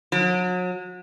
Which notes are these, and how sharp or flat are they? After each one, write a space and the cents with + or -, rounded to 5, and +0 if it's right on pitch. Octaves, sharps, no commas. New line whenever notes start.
F#3 -35